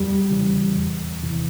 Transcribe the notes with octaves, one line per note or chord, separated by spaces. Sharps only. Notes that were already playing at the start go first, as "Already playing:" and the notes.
Already playing: E2 G3 G4
C#3 E3
E2
C3 E3